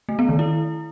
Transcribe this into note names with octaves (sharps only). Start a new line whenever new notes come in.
A3
B3
D#3
E4